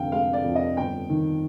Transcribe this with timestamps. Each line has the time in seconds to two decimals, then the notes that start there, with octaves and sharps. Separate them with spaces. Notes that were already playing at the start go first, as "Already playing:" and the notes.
Already playing: F1 D3 F5 G5
0.12 G#3 F5
0.33 D5
0.44 F2
0.55 D#5
0.77 G1 G5
1.10 D#3